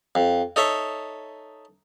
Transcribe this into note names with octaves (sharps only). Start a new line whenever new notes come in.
F2
D#4 A4 C#5 E5